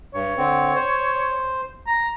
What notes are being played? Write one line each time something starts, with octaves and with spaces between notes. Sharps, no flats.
G2 C#5
D3 C4
C5
A#5